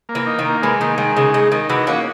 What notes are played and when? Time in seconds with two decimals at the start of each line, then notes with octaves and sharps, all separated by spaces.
0.09 A#3
0.15 E3
0.26 D#4
0.39 D#3
0.45 A#3
0.62 E3 G#3
0.81 D#3 D#4
0.98 D#3 G#3
1.16 C#3 D#4
1.33 C#3 D#4
1.52 D#3 D#4
1.69 E3 F#4
1.87 A#3 C#4 F#4